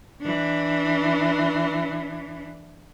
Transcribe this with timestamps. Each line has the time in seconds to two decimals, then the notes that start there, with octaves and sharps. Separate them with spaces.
0.21 E3 D4